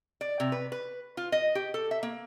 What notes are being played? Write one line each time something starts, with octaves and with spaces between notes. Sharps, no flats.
D5
C3
B4
B4
F4
D#5
G4
A4
E5
A#3